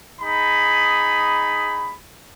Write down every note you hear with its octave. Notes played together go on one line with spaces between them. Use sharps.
D#4 G#4 B5